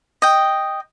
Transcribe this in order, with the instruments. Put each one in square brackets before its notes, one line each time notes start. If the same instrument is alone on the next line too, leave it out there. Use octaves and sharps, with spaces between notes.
[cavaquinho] D#5 G5